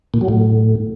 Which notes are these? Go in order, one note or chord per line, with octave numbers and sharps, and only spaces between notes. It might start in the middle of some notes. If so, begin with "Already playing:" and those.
A#2
F#3
A2